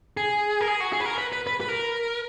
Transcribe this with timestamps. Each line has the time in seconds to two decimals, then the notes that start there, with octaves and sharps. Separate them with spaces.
0.17 G#4
0.61 A#4
0.68 G#4
0.80 F#4
0.93 G#4
1.00 B4
1.06 A#4
1.18 B4
1.33 B4
1.47 B4
1.61 B4
1.69 A#4